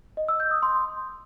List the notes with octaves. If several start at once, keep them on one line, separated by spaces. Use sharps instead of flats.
D#5
E6
G6
D#6
C6